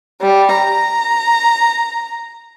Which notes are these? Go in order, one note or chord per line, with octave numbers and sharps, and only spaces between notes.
G3
A#5